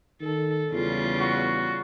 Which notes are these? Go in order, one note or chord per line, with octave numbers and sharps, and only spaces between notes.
D#3 A4
E2 C#3 G3 F4
F#4